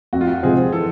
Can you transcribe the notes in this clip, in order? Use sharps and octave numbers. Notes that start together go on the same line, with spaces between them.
F2 F#4
F4
F#4
C3 F3 G#3 C4 G#4
E3 A4